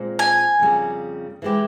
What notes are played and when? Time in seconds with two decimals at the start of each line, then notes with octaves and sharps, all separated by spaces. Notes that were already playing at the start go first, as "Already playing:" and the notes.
Already playing: A#2 G#3 C4
0.19 G#5
0.60 F2 C#3 G3 A#3
1.42 E3 G#3 E4 G4